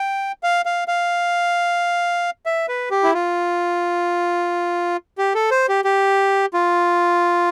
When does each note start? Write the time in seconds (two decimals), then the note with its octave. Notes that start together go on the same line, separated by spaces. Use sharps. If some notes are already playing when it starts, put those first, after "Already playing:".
Already playing: G5
0.43 F5
0.66 F5
0.88 F5
2.46 E5
2.69 B4
2.91 G4
3.03 E4
3.14 F4
5.18 G4
5.35 A4
5.51 C5
5.69 G4
5.85 G4
6.54 F4